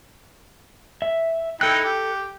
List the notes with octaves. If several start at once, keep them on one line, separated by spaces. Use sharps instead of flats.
E5
D#4 E4 A4 G5 F#6
G4